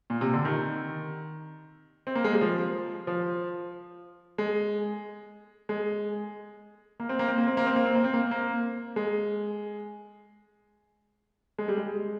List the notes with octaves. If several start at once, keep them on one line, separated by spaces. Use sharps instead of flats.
A#2
C3
D3
D#3
C4
A#3
G#3
G3
F3
F3
G#3
G#3
A#3
C4
A#3
C4
A#3
C4
A#3
C4
A#3
C4
A#3
C4
A#3
A#3
G#3
G#3
G3
G#3